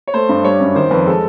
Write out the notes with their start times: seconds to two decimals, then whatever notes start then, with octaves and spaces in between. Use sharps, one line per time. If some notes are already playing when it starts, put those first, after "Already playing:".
0.07 C#5
0.14 A3 C5
0.29 G2
0.44 G3 C#5
0.60 F#2
0.75 D#3 C5
0.91 F2 B4
1.06 G#3 A4